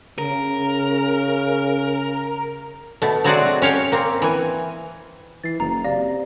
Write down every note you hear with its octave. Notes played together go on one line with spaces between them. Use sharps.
C#3 A#4
B2 A3
F#3 G#3 C4 F#4 G#4 D5
C#4 C#5 F5 G5
A#3 C4
E3 G#5
E3 A6 C7
F#1 A#5
C3 D5 F5 A#6